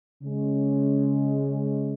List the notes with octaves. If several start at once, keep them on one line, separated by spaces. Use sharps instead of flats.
C#3 G#3 C#4